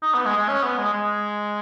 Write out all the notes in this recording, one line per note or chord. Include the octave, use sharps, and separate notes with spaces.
D#4
B3
G#3
G#3
C#4
B3
G#3
G#3